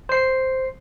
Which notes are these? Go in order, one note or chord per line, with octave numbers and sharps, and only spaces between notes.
C5 C7